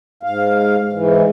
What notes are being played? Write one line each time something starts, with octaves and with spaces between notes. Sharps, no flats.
G#2 F5
G#2 E3